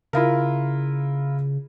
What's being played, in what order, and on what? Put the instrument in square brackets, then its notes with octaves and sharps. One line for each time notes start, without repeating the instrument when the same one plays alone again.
[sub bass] C#3 [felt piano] E4 F4 A#4